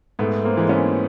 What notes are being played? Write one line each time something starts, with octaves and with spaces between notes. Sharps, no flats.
G#2 A3 B3
A#3 C4
E3 G#3
B3 C#4